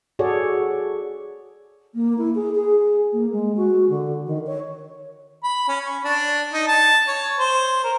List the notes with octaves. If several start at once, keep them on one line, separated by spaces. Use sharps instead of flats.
F#4 G#4 A4 C#5 D5
A#3
E4
G#4
G#4
A#3
G#3
F#4
D3
D#3
C#5
B5
C#4
C#6
D4
D#4
A5
C#5
C5
A#4